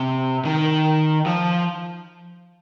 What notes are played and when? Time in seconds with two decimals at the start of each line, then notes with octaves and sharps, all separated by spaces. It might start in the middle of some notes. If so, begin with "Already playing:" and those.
Already playing: C3
0.45 D#3
1.26 F3